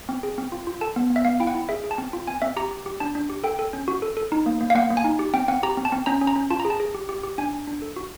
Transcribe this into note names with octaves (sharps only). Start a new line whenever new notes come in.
C4
G#4
C4
F4
F4
A4 A5
B3
B3
E5
B3 F5
E4 G5
F#5
E4
G#4 E5
G#4
A5
C4
F4
C4 G#5
C4 E5
G4 A#5
G4
G4
D4 A5
D4
G4
A4 G5
A4
C#4
F#4
A4
A4
D#4
A#3
A#3
F5
A#3 F#5
A#3
G#5
D#4
G4
C4 G5
C4 F#5
G4 A#5
C4
A5
C4
C#4 A#5
C#4
A#5
C#4
F4 A5
A#5
G#4
A5
G#4
G4
G4
G4
D4 G#5
D4
D4
A4
F#4